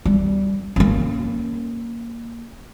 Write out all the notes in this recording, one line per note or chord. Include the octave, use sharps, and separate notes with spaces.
G3
A#3 C#4